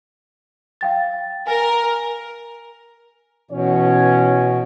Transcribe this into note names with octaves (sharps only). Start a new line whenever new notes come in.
F5 G5 A6
A#4 G#5
B2 E3 C#4 C#5